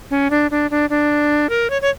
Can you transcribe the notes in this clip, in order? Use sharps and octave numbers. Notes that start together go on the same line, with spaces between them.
C#4
D4
D4
D4
D4
A#4
C#5
C#5